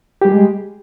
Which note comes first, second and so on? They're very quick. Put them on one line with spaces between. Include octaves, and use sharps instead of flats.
G4 G3 G#4 G#3